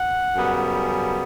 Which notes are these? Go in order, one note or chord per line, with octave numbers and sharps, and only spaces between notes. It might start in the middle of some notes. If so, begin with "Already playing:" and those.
Already playing: F#5
F#2 C#3 G3 B3